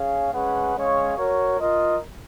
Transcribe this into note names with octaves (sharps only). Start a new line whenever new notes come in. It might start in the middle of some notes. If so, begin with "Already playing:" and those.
Already playing: C#4 G#4 C#5 F5
G#3 C#4 G#4 B4 F#5
G#3 C#4 G#4 C#5 F5
F#4 A#4 C#5
F4 A#4 D#5